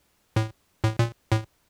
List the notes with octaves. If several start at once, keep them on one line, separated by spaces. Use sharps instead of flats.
A2
A2
A#2
A2